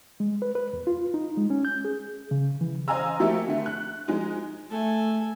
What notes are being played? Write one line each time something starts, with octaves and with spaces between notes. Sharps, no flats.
G#3
B4
B4
E2
F4
D#4
G#3
C#4
G6
G#4
C#3
E3
C5 D#5 F5 G#5 A#5 E6
F3 A3 A#3 G4
D3 A3
F#6
F3 G#3 D#4
A3 A4 G#5